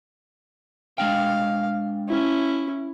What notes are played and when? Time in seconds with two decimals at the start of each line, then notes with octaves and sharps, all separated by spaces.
0.98 G#3 D4 F5 G5
2.08 C#4 E4